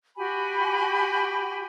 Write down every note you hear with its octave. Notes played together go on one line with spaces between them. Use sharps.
F#4 G4 G#5 B5